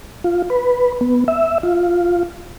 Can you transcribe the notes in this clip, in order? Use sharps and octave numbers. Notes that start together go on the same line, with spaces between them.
F4
B4
B3
E5
F4